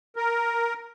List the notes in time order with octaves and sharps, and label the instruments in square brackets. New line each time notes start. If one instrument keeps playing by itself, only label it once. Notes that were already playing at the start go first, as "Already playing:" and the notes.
[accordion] A#4